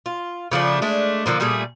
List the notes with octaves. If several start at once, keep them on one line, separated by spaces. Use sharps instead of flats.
F4
C#3 F3 A3 D4
G#3 A3 D4
D3 F3 A#3
A#2 G3 A3 G#4